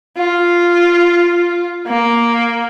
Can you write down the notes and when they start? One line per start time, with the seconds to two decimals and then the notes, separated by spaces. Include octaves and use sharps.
0.17 F4
1.87 A#3